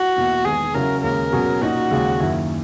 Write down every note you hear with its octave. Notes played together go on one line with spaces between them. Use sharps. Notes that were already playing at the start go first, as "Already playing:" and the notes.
Already playing: F#4
E2 B2 A#3 E4
E2 D#3 G#3 B3 G#4
C#3 F#3 C#4 E4 A#4
D#2 C#3 G#3 C#4 A#4
B2 F#3 C#4 G#4
A#2 A#3 D#4 F#4
D#2 C#3 G#3
F#2 D#3 A#3 E4